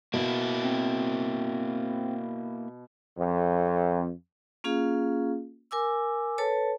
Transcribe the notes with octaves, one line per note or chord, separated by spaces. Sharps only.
B2 A#3 E4
C4
F2
A#3 C#4 F4 G#4 F5
A#4 G#5 D6 E6
A4 B4 C#5 A5